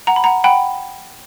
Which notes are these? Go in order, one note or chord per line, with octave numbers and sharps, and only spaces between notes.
F#5 A#5
B5
F#5 A#5
F#5 G5 B5